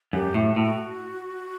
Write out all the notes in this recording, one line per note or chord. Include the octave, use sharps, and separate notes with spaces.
F#2 G4
A2 F#4
A2